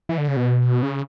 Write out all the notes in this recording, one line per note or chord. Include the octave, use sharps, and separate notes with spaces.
E3
D3
C#3
B2
C#3